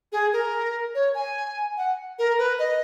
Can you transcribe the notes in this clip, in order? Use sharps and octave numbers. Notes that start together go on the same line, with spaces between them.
G#4
A#4
C#5
G#5
F#5
A#4
B4
D#5